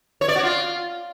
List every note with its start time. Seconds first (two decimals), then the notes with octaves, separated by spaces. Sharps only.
0.21 C#5
0.28 D5
0.36 F#4
0.43 F4